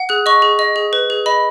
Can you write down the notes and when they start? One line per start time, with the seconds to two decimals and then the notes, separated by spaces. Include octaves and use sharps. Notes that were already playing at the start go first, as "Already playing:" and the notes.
Already playing: F#5
0.09 G#4 F#6
0.26 D#5 C#6
0.42 G#4
0.59 D#5
0.76 G#4
0.93 B4
1.10 G#4
1.26 D#5 B5